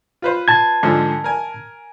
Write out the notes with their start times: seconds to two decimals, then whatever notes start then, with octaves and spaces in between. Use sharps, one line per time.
0.22 F4 B4 C5
0.48 A5 G#6
0.83 G#2 D3 F3
1.24 A#4 G#5